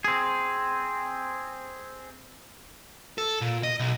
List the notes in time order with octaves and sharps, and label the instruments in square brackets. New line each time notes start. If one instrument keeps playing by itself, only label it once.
[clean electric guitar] C4 G#4
[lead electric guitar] A4
A#2
D#5
B1